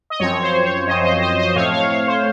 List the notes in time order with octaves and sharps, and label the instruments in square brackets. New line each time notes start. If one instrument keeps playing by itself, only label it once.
[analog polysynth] D#5
F#2 F3 C4 C#5
C5
C#5
F#2 F3 C4 C5 D#5
C5 D#5
C5 D#5
C5 D#5
A2 A3 C4 C#5 F5
C#5 F5
C#5
C5